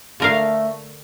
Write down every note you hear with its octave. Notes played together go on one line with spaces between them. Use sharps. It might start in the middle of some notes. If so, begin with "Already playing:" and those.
D3 A3 A#4 F5